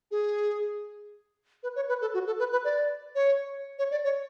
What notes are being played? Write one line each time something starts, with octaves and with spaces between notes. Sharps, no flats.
G#4
B4
C#5
B4
A4
F#4
A4
B4
B4
D5
C#5
C#5
D5
C#5